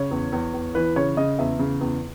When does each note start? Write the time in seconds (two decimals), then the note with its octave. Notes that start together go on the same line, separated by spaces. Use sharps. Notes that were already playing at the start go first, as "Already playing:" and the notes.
Already playing: C#3 C#5
0.11 E2
0.33 E2
0.53 E2
0.75 E3 B4
0.96 C#3 C#5
1.17 C#3 D#5
1.39 E2 E5
1.59 C#3
1.81 E2